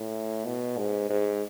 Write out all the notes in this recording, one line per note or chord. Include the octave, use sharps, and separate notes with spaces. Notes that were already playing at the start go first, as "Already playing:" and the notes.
Already playing: A2
B2
G#2
G#2